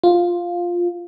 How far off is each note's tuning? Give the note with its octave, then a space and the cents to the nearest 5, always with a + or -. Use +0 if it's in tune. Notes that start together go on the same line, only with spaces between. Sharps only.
F4 +5